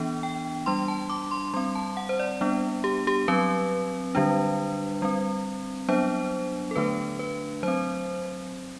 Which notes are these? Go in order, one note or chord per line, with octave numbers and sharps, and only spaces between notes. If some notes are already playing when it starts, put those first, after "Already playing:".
Already playing: E3 B3 D4
G5
G3 D4 C6
A5
D6
C6
G3 C4 C6
A5
F#5
C5
D5
G3 B3 D4
G4
G4
F#3 C4 B4
D3 G3 D4
G3 C4
F#3 B3 D4 C5
A4
D3 A3 D4 B4
B4
F#3 C4 C5